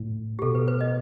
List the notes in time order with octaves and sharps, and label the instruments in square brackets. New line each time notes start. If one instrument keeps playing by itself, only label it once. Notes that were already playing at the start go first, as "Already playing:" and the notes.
Already playing: [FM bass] A2
[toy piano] G4
[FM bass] B2 [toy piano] A4
[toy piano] B4
B4
D#5